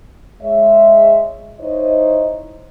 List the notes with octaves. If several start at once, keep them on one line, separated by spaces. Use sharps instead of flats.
G#3 C#5 E5
D#4 E4 C5 C#5 D#5